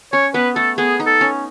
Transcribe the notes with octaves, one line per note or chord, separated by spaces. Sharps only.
C#4 C#5
B3 B4
A3 A4
B3 G#4
D#4
A4
C#4